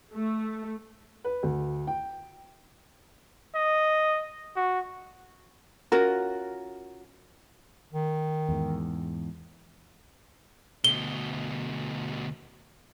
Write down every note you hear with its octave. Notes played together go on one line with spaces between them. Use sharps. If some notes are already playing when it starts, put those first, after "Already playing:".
A3
B4
D2
G5
D#5
F#4
C#4 F4 F#4 A#4
D#3
E2 G#2
D2 B2 G7